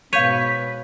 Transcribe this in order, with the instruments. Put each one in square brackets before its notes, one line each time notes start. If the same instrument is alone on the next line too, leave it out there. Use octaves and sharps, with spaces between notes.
[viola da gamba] G#2 B2 B4 [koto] C#5 [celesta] F5 G6 D#7 [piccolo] B6